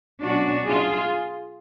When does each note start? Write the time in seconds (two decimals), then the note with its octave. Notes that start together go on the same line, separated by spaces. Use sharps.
0.22 B2 F#3 C#4 D4 F#4
0.66 F4 G#4